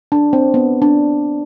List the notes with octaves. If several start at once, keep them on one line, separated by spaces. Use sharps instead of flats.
D4
C4
B3
D4